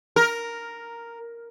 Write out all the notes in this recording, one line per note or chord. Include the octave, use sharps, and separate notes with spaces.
A#4